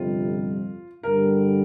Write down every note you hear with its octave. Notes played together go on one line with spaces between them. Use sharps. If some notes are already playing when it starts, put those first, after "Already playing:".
Already playing: G1 F2 C3 G3 F4
G2 D3 G3 A#4